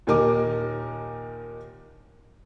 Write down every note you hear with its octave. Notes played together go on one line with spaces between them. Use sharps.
D#2 A#2 D#3 A#4 D#5 D6